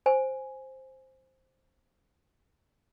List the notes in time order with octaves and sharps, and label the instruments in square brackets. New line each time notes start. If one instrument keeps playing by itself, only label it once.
[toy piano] C5 G#5